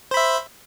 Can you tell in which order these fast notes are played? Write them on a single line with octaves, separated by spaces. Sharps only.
C5 B5 E5